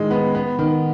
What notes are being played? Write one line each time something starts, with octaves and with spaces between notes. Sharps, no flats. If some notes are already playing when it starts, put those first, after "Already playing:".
Already playing: A2 D#3 G#3
B3
B3
D#3